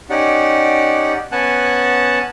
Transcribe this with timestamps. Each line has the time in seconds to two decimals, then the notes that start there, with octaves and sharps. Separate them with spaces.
0.10 C#4 D#4 G4 D5 F#5
1.32 B3 C#4 F#5 G#5 A5 F#6